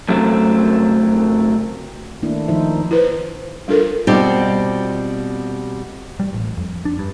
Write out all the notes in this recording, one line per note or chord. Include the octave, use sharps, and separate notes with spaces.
F#2 C#3 F#3 A3 C4
D#3 A3 A#3 D4 E4
D#3 F3 D#4 C5 E5
E4 B4 C5
G3 D4 F4 A4 A#4
B2 G3 C4 F4 G4
G3
A1
F2
D4
G2